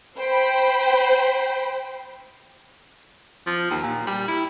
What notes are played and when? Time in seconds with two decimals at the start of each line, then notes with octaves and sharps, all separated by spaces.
0.16 C5 G5 B5
3.47 F3
3.70 D#2
3.83 A#2
4.07 G3
4.28 E4